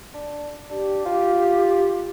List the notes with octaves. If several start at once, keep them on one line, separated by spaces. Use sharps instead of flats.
D4
D4 G4
F4